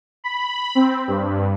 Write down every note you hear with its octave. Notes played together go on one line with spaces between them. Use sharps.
B5
C4
G2